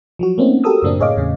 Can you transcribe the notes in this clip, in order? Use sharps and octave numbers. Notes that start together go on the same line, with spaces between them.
F3 F#3 F#4
A3 A#3 C4 C#4 D#4
F#4 G4 A4 A#4 D#6 E6
F#2 A2 C#3 A#3 C4 D4
A2 G#4 C#5 D#5 F5 D6
E2 A2 C#3 C#4